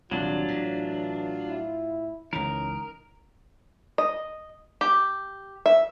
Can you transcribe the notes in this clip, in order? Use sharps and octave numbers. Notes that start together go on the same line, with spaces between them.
D#1 C2 F#3 G3 D4 F4
A2 E3
E4
C#2 E3 C#4 D#4 A#4
D#5
G4
E5